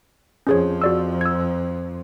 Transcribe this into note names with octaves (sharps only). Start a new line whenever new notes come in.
F2 F3 C#4 G#4 C#5
F#4 D5 E6
E6 G#6